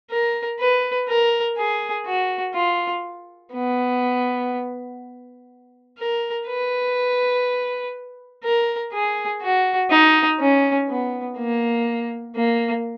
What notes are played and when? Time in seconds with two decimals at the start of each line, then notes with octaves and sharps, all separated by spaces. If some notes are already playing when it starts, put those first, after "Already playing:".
0.10 A#4
0.59 B4
1.08 A#4
1.57 G#4
2.06 F#4
2.55 F4
3.53 B3
5.98 A#4
6.47 B4
8.44 A#4
8.92 G#4
9.41 F#4
9.90 D#4
10.39 C#4
10.88 B3
11.37 A#3
12.35 A#3